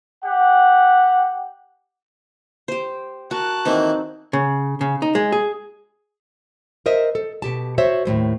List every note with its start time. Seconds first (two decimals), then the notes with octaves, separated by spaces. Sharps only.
0.24 G4 F#5
2.68 G4 C5
3.31 F#4 A#4 A5 F#6
3.65 D#3 E3 A#3 C4 D#4
4.33 C#3
4.81 C#3
5.02 D#4
5.15 G#3
5.32 G#4
6.86 A#4 C5 D#5 E5
7.15 A4
7.42 B2 G4 A5
7.78 F#4 C5 C#5 E5
8.05 D#2 A2 G#3 C5